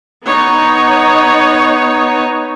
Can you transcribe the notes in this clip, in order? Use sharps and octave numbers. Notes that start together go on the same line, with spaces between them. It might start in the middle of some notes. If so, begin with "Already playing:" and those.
B3 D#4 C#5